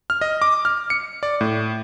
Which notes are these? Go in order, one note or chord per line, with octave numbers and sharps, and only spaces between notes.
F6
D#5
D6
F6
C#7
D5
A2